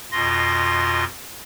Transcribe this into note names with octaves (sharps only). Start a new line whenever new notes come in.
F2 B2 F4 C6 A#6